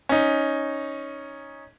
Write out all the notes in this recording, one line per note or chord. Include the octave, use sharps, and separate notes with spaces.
C#4 D#4